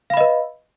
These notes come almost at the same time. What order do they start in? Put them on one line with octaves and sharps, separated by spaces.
F5 B5 D#5 B4